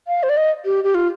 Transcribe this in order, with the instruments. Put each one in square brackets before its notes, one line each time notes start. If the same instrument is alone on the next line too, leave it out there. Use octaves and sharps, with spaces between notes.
[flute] F5
C5
D5
D#5
G4
G4
F4